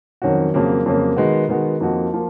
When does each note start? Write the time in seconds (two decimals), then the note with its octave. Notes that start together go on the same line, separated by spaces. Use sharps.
0.22 F2 D#3 F#3 C#4 F#4
0.54 F2 C#3 F#3 A#3
0.86 F2 C#3 F#3 A#3
1.17 D#3 G#3 B3 F#4
1.49 D#3 G#3 B3 F#4
1.80 F2 F3 A#3 D#4 F#4
2.14 F3 A#3